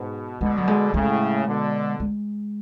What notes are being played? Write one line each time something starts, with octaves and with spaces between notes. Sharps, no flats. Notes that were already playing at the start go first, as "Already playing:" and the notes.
Already playing: G#2 B2
B2 D3 G#3
F#3
G#3
A2 C#3 G#3
B2 D3
G#3